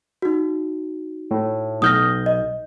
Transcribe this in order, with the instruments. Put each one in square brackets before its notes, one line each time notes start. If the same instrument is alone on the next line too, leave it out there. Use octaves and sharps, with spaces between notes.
[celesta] D#4 F#4
[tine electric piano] A2
[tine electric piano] B1 G6 [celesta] D#6 F6 A#6
[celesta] D#5